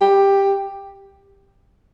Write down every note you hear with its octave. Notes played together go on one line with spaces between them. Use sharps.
G4